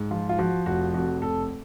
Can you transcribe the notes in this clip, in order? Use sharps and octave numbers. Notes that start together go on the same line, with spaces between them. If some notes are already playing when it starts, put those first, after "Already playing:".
Already playing: G#2
F3 F4
F4
F3 F#4
F1 F#4
F2 F#4
F1 A4